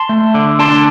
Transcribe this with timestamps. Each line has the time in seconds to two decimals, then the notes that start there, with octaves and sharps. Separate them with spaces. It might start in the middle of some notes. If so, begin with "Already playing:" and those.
Already playing: A5 C6
0.09 A3
0.34 D3
0.59 D4 A5 C6